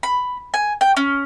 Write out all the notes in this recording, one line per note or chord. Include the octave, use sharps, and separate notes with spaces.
B5
G#5
G5
C#4